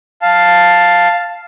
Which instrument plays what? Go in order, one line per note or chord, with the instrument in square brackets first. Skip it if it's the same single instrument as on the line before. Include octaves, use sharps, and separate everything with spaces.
[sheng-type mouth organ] F5 A5